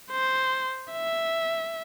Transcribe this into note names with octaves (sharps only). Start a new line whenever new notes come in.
C5
E5